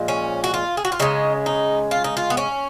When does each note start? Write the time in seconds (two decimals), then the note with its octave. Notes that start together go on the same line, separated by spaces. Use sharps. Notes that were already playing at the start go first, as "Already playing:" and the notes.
Already playing: A#2 F3 G#3
0.08 C#4
0.44 F#4
0.54 F4
0.77 G#4
0.85 F#4
0.92 F4
0.99 C#3 G#3 D#4
1.46 D#4
1.91 F4
2.04 D#4
2.17 F4
2.30 B3
2.37 C#4